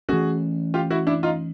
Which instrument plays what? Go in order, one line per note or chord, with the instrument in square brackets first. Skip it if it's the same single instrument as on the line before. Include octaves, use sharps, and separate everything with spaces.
[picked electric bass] E3 A3 C#4 [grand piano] F#4 G#4
[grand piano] F4 G4
E4 F#4
D4 E4
D#4 F4